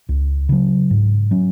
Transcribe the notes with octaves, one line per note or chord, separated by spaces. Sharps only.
C#2
C#3 F#3
G#2
F#3 C#4